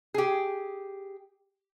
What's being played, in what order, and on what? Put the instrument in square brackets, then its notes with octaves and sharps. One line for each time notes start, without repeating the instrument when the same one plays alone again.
[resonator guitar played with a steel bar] G4 G#4